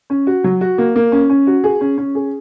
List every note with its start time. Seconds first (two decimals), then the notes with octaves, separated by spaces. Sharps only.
0.10 C#4
0.27 F#4
0.44 F#3
0.61 F#4
0.78 A#3
0.96 A#3
1.12 C#4
1.30 C#4
1.47 F#4
1.64 G#4
1.81 C#4
1.98 C#4
2.15 G#4